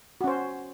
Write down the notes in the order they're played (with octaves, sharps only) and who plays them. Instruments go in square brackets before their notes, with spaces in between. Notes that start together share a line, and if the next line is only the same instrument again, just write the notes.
[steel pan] F#4
C#4
C5